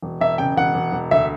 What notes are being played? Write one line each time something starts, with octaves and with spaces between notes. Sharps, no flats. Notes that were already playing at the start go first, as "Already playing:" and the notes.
E1
E1 E5
C#3 G5
E1 F#5
E1
E1
D2 E5